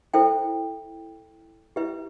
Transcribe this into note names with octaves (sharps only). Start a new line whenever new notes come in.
E4 A4 C5 E5 G5
E4 G4 B4 E5